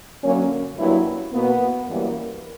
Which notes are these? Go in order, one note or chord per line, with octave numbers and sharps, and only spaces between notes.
F#2 D3 F#3 A#3 C#4
G2 F#3 A#3 E4
B2 A#3 B3
F#2 E3 G3 A#3